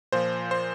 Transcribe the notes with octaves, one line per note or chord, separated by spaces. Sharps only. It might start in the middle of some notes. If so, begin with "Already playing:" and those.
A#2 F3 C5
C5